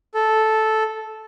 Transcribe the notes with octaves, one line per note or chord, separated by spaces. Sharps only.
A4